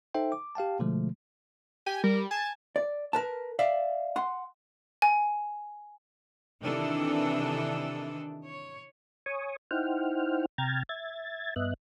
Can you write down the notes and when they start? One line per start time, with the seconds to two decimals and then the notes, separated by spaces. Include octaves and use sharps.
0.14 D#4 A4 C5 E5 G5
0.32 D6
0.55 G4 F5 G5 A5
0.79 B2 D3 F3 G#3 A3
1.86 G4 G#5
2.03 G3 A#4
2.31 G#5 A5
2.76 D5
3.13 A#4 B4 A5
3.59 D5 E5 F5
4.16 F#5 C6
5.02 G#5
6.62 C3 D#3 E3 D4 A4
8.45 C#5
9.26 C#5 G#5 C#6 D#6
9.71 D#4 E4 C5 F#5 G5 F6
10.58 C3 G5 A#5 F6 G#6 A6
10.89 E5 G#6 A6
11.56 G2 B3 D#5 E5 F#6